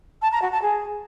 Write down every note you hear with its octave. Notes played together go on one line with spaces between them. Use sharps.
A5
A#5
F#4
A5
G#4